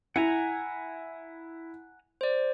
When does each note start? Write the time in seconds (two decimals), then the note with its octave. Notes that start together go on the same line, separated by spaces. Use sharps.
0.16 E4 F#5 G#5 A#5
2.21 C5 D5